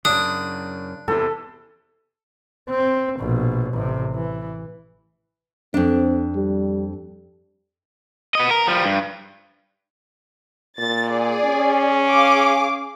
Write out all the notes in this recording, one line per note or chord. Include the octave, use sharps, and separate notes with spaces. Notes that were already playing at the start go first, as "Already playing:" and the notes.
F#2 C#3 D4 D#6
E2 C3 A4
C4
A#1 B2
A1 C3
E3
F2 C4 D4
G3
B3 D#5
A#4
F3 G3
G2
A#2 A6
G#4 D5
C#4
G#4 F5 D6